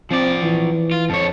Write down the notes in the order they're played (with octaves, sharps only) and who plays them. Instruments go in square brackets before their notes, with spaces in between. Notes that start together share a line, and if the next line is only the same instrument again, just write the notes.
[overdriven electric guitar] F3 D5 [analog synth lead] C4
[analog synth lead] E3
[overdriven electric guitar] F4
[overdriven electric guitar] F2 C#5 [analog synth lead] A5